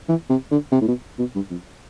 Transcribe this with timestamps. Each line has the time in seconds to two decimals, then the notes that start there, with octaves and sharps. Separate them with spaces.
0.08 E3
0.29 C3
0.51 D3
0.72 C3
0.81 A2
0.88 B2
1.19 B2
1.35 G2
1.50 F2